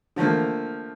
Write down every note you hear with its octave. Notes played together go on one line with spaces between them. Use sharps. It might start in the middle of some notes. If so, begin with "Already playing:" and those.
D3 F3 A3 A#3